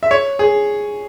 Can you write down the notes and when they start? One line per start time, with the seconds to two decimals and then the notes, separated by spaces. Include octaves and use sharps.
0.03 E5
0.11 C#5
0.39 G#4